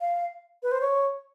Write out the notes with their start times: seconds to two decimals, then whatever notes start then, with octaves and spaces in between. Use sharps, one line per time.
0.01 F5
0.63 B4
0.72 C5
0.81 C#5